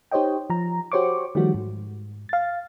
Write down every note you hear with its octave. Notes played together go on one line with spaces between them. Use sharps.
D#4 G4 C5 C#5 D#5 G5
F3 A#5
F#4 G4 C5 C#5 C#6 D6
D#3 F3 G3 A3 F#4
G#2
F5 A6